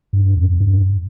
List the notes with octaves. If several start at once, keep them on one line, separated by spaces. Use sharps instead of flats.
G2
F2
G2